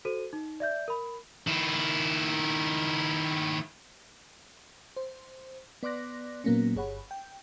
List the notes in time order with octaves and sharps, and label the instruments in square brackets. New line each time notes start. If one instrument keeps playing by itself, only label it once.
[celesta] F#4 A4 C5 D#7
D#4
D5 E5 G6
A#4 B5
[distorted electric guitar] D#3 E4
[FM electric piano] C5
B3 D5 C6 D6 F#6 A#6
A#2 F#3 A#3 B3 C#4
G1 G#4 C#5 F#5 B5
G5